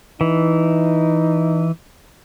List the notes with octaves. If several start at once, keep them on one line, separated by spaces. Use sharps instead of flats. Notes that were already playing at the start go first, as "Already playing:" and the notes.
E3 D#4